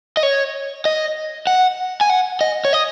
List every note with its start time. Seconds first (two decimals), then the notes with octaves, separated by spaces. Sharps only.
0.17 D#5
0.23 C#5
0.85 D#5
1.47 F#5
2.01 G#5
2.10 F#5
2.41 D#5
2.65 C#5
2.73 D#5